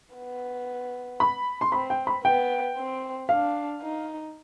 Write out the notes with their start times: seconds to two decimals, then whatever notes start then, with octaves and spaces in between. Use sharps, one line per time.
0.15 B3
1.20 B5
1.61 C6
1.72 C4 B5
1.90 G5
2.07 B5
2.25 B3 G5
2.77 C4
3.29 D4 F5
3.82 D#4